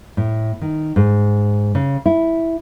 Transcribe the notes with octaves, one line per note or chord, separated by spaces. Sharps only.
A2
D#3
G#2
C#3
E4